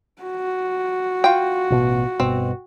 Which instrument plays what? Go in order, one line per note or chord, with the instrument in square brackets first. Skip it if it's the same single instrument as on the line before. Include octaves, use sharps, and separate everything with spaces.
[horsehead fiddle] F#4
[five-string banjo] F4 G5
[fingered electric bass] A1 B2 B3
[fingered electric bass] G1 B2 [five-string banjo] C4